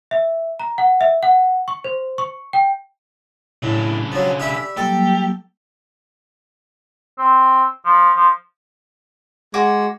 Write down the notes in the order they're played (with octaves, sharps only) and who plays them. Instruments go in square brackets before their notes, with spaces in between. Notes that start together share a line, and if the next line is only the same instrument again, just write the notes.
[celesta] E5
A#5
F#5
E5
F#5
C#6
C5
C#6
G5
[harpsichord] A2 [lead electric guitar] C#3 D4
[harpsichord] F3 F#3
[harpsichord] G4 E5 B5 [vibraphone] D5
[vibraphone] F#3 G3 A#3 [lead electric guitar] G4 [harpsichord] A4
[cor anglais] C4
F3
F3
[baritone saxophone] G#3 [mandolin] F#4 D6